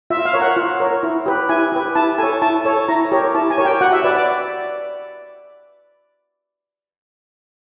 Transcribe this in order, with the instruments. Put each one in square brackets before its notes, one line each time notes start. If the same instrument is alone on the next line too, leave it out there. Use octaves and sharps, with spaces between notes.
[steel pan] F4 E5
F5
A#4 C#5
F#5
F4
A#4 C#5
E4
G4 B4
E4 G#5
G4 B4
E4 A5
A4 C#5 G#5
E4 A5
A4 C#5
E4 A#5
G4 A#4 C#5
E4 A5
G#5
G4 A#4 C#5
G5
F#4 F#5
E5
B4 D5
D5